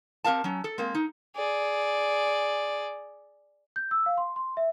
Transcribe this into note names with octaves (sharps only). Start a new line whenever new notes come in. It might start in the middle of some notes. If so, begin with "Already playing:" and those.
C4 G4 A#4 F5 A5
F#3 C#4
A4
G#3 A#3 C4
D#4
G#4 D5
G6
E6
F5
C6
C6
E5